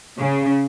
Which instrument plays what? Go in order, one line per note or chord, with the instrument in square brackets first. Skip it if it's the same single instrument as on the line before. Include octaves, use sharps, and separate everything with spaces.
[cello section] C#3